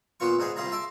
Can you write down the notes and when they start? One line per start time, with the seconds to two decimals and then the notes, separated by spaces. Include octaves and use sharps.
0.20 A#2 B3 F4 C#6
0.39 G#2 D4 D#4 G#4
0.56 C2 G3 F4 G#4 A#5
0.72 E5 A5 C6 D6